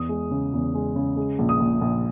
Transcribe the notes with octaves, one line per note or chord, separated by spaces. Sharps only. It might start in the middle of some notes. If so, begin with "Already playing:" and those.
Already playing: E2 D#6
G#3
C#3
E2
G#3
C#3
G#3
A#1
D#6
A#1
A#1